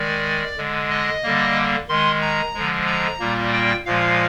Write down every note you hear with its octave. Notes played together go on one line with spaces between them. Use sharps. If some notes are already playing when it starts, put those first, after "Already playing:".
Already playing: D#3 G#3 D5
D3 G#3
D#5
D3 G3 A#3
D#3 G#3 C6
A#5
D3 F3 G#3
A#5
A#2 G3 A#3
G5
A#2 F3 G#3 F5